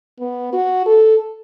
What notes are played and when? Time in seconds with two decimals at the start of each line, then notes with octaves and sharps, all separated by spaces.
0.20 B3
0.53 F#4
0.86 A4